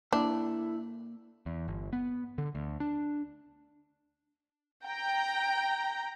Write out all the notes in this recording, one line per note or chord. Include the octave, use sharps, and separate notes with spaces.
A#3 D4 E4 A4
E2
G1
B3
D3
D2
D4
G5 A#5